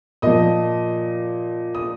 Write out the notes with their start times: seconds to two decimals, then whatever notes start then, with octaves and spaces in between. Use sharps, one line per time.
0.22 A#2 F3 D#5 D#6
1.75 D#6